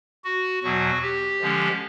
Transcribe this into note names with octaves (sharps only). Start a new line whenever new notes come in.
F#4
E2 B2 F#3 F#4
G4
D3 F3 G#3 C#4